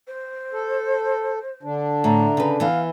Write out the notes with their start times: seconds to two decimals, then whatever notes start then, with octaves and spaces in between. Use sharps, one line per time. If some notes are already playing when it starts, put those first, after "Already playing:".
0.07 C5
0.53 A4
1.63 D3 D4
2.04 A2 A#5
2.37 C#3 B4
2.60 E3 B3 F5